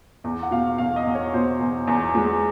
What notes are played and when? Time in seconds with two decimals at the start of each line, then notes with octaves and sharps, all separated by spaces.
0.24 E2
0.43 F#5
0.51 B2 F5
0.78 E2 F5
0.96 D#5
1.06 E2
1.15 C#5
1.34 B2 C5
1.60 E2
1.87 E2
2.15 G#3